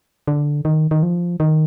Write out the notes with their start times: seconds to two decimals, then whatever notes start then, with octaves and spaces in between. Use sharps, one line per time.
0.27 D3
0.65 D#3
0.91 D#3
1.03 F3
1.40 D#3